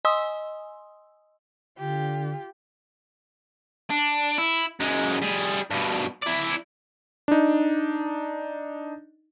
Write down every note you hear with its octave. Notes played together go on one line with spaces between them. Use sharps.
D#5 G#5 C6 D#6 E6
D3 F4 G4
D4
E4
F#2 G#3
G3 G#4
G2 B2
E4 D5
D4 D#4